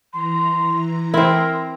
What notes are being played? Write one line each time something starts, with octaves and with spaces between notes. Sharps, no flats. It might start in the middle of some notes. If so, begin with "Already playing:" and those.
E3 A#5 C6
C4 E4 A#4 C6